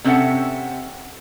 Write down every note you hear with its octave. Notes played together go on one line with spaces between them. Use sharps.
C3 C4 C#4 A4 E5 F#5